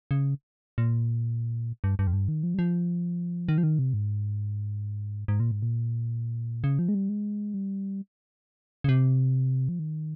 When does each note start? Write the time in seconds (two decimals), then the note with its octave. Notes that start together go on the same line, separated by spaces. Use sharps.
0.11 C#3
0.78 A#2
1.84 G2
1.99 G2
2.07 F2
2.13 G2
2.28 D#3
2.43 F3
2.54 G3
2.59 F3
3.49 D#3
3.58 F3
3.63 D#3
3.79 C3
3.94 G#2
5.28 G#2
5.40 A#2
5.51 G#2
5.63 A#2
6.64 C#3
6.79 F3
6.89 G#3
6.95 G3
7.09 G#3
7.54 G3
8.84 C#3
8.89 C3
9.69 F3
9.79 D#3